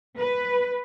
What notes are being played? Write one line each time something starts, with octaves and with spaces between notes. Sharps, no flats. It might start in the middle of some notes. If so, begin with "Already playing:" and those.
B4